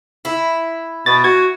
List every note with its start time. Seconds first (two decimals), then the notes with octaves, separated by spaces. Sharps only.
0.25 E4
1.06 B2 A6
1.24 F#4 G#6